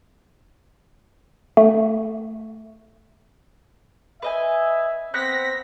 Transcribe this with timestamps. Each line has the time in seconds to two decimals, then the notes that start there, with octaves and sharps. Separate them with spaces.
1.57 A3
4.22 B4 D#5 E5 G#5
5.14 B3 C4 F#6 A#6 B6